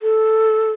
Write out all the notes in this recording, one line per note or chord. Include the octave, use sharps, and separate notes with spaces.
A4